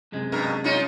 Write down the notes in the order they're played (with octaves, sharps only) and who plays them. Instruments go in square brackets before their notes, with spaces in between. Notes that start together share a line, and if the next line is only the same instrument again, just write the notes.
[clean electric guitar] F#2 C3 G#3
[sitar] G2 B2 A#4
C#4 D#4 F4